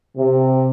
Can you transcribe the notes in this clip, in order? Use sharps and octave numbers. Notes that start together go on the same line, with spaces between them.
C3